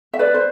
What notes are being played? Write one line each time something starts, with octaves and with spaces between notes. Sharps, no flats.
E5
B4 D5
C5